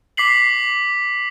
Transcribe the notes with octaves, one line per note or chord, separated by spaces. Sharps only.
D6 B6 C7 F#7